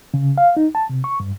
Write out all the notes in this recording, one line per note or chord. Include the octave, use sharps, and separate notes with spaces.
C#3
F5
D#4
A5
C3
C#6
G2